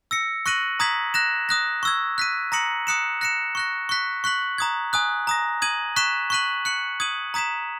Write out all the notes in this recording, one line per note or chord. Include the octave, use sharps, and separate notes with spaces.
E6 A#6 C#7
C#6 F#6 A#6 D#7 F#7
A#5 D#6 G#6 B6 F#7
F#6 A#6 E7
D#6 F#6 A#6
C#6 E6 G#6
F#6 B6 D#7
A#5 D#6 A#6 C#7 F#7
D#6 F#6 C#7 E7
F#6 A#6 C#7 E7
C#6 F#6 A#6
C#6 F#6 B6
C#6 F#6 B6 F#7
A#5 D#6 G#6
G#5 D#6 F#6
A#5 D#6 A#6
D#6 G#6 D#7 F#7
C#6 F#6 B6 E7
C#6 F#6 B6 D#7 F#7
F#6 C#7 F#7
D#6 G#6 D#7 F#7
A#5 D#6 G#6 B6 E7